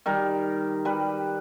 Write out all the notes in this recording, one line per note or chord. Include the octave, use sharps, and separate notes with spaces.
D#3 G3 A#4
G3 B4